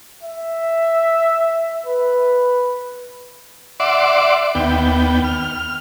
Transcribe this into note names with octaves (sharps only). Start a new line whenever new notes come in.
E5
B4
D5 E5 F#5 C6 D6
D#2 B3 G5
F6